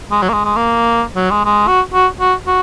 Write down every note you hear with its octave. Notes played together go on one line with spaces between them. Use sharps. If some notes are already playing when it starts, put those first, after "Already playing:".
G#3
F#3
A#3
G#3
G#3
A#3
F#3
G#3
G#3
F#4
F#4
F#4
F#4